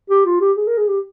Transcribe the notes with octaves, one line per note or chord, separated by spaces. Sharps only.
G4
F4
G4
G#4
A#4
G#4
G4